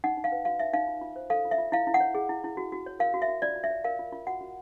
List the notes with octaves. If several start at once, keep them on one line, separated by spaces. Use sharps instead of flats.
D#4 F#5
D#4
F5
B4
F#4 F5
D#4 E5
D#4 F5
F4
F4
C5
A4 F5
F4
E5
F4
E4 F5
E4
F#5
C#5
G#4
E4
E4
F#4
F#4
C#5
A#4 F5
F#4
E5
F#4
F4 D5
F4
E5
C#5
A#4 F5
F4
F4
F#4 F#5
F#4